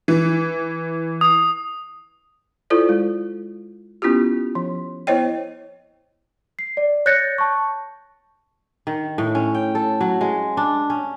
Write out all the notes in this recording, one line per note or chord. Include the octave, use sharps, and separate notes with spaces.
E3
D#6
E4 F4 A4 C5 D5
G#3
B3 C#4 E4 F4 G4
F3
B3 E4 C5 C#5 D#5 G5
C7
D5
C#5 F#6 G6 A6 A#6 C#7
A5 C#6
D#3
A2
C#4
G5
A4
F#3
G#3
D4
C#4